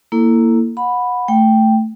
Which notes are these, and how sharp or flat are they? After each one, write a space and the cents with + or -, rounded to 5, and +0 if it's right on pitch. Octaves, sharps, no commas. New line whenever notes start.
A#3 +0 E4 +0 A4 +10
F#5 -25 B5 +0
A3 +0 G5 +0